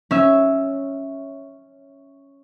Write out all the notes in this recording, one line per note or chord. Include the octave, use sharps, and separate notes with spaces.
C#4 E5